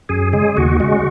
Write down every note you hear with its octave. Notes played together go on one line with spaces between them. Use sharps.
F#2 G#4
C#3 G#3 G#4
D#2 F#4
C#3 G#3 F#4